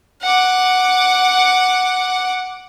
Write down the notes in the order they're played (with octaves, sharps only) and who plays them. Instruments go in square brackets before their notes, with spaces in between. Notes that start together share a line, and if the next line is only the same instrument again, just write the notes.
[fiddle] F#5 D6